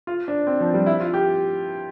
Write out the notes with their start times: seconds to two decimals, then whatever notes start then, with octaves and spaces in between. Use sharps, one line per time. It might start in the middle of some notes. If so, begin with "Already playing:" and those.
0.07 F4
0.28 D4
0.47 C4
0.60 F3
0.74 G3
0.86 E4
1.00 F4
1.14 G4